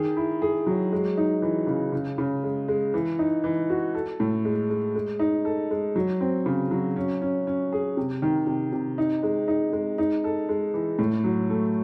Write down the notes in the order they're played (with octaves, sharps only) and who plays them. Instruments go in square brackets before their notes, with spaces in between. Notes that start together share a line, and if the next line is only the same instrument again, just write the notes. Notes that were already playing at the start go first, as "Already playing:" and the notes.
Already playing: [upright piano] D#3 G#4
E4
G#4
F#3
G#3
D#4
E3
C#3
C#3
C#3
G#3
G#3
E3
D#4
E3
F#4
A4
A2
G#3
G#3
G#3
D#4
A4
G#3
F#3
C4
C#3
F#3
C#4
C#4
C#4
G#4
C3
D#3
C3
C3
D#4
G#3
D#4
G#3
D#4
A4
G#3
E3
A2
F#3
A3